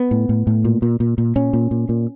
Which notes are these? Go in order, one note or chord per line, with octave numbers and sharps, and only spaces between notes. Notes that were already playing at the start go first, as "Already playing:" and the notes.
Already playing: B3
A2
A2
A2
A#2
A#2
A#2
A#2
A#2 C#4
A#2
A#2
A#2